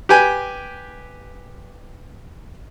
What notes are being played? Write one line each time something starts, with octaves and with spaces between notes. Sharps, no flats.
G4 B4 G5 G#5